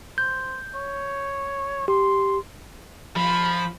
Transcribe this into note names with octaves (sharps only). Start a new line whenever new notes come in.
C5 G6
C#5
G4 C6
F3 B5